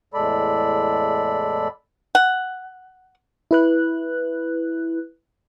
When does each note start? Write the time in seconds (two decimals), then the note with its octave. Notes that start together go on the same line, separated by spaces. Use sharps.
0.14 E2 A2 G#3 A4 D5 B5
2.15 F#5
3.51 E4 B4 F#6